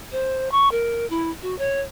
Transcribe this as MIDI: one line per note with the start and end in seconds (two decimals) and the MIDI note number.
0.12 0.51 72
0.52 0.68 85
0.71 1.08 70
1.10 1.30 64
1.42 1.57 66
1.58 1.81 73